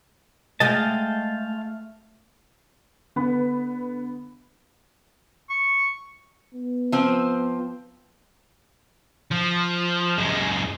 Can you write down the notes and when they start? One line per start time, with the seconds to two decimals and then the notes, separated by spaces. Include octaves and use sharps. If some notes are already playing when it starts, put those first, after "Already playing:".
0.60 G#3 A3 D#5 F5 G5 A5
3.16 D3 B3 B4 B5
5.50 C#6
6.54 B3
6.92 F3 C4
9.31 F3
10.18 F#2 G#3